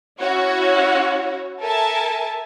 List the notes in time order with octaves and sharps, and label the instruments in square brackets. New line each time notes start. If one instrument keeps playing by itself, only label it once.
[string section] C#4 E4 F#4 C#5
A4 A#4 E5 G#5 A5